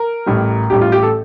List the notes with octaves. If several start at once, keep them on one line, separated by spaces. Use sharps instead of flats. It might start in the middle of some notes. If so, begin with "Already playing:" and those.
Already playing: A#4
A1 A2 G3
A1 A2 G3 G4
F4
G4
A4